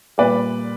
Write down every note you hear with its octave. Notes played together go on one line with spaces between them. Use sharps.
A#2 G3 B4 D5